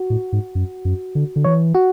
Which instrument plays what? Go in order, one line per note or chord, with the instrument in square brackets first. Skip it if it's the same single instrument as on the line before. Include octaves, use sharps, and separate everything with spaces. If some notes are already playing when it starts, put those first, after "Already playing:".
Already playing: [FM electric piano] F#4
[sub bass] A2
G#2
F#2
F#2
D3
D3
[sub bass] E3 [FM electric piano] C#5
[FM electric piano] F#4